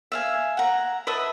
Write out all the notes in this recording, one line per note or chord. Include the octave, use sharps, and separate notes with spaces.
E5 F5 G#5
F#5 A#5
B4 D#5 E5 A5